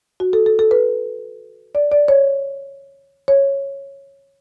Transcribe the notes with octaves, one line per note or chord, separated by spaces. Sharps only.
F#4
A4
A4
A4
B4
D5
D5
C#5
C#5